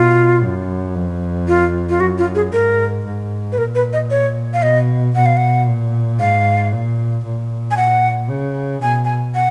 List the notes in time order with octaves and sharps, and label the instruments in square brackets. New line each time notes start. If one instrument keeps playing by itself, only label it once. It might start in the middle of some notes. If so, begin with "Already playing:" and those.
Already playing: [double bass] B2 [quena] F4
[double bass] F#2
F2
[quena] F4
F4
[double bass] F#2 [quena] F#4
[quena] F4
G#4
[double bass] G#2 [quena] A#4
[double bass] G#2
[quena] B4
[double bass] A#2 [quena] A#4
[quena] B4
D#5
C#5
F5
[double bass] B2 [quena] D#5
[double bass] B2 [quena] F#5
[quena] F5
F#5
[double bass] A#2
[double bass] G#2 [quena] F5
[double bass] A#2
A#2
[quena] G#5
F#5
[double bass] C#3
[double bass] B2 [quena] G#5
[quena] G#5
F#5